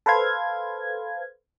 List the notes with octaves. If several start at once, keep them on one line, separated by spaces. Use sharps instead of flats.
A4 B4 C5 F5 G#6